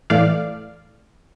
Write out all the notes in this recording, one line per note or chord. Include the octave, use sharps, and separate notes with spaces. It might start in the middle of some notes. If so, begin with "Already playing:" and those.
A2 E3 A3 D5 F5